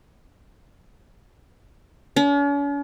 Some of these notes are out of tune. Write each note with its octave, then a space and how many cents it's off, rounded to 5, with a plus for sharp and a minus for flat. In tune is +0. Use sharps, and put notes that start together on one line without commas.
C#4 +45